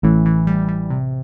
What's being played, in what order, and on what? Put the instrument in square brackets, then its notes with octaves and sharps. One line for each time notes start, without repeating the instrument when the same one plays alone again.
[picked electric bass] A1 A2 [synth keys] E3
[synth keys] E3
G3
G3
C3